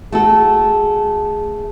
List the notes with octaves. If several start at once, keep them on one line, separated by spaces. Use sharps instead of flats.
A3 F#4 G#4 A4